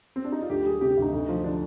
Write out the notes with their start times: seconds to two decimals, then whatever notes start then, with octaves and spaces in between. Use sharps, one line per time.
0.16 C4
0.25 D4
0.32 D#4
0.42 F4
0.50 D2 G4
0.66 G3 G#4
0.81 C3 G4
0.97 D2 D#4
1.13 D2
1.29 F3
1.44 D3 D4